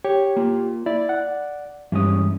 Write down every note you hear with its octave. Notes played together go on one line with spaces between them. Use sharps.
G4 C#5
A#3 F4
E4 D5
F#5
G2 E3 G#3 C#4 D#6